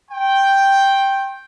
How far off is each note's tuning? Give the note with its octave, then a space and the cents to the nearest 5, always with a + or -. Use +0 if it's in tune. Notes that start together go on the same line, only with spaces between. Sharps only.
G5 +0 C6 +40